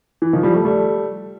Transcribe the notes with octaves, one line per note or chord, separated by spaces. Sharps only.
E3
D#3 F3
F3 G3
G3 A3
G3 A3